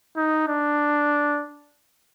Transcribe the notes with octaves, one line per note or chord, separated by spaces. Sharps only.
D#4
D4